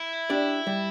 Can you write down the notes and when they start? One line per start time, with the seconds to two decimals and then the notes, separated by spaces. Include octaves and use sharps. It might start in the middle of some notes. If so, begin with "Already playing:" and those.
Already playing: E4
0.30 D4 G4 D5
0.67 G3